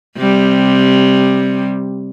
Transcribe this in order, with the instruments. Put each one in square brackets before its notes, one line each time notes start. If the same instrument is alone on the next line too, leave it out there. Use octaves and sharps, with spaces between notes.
[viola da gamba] C3 G3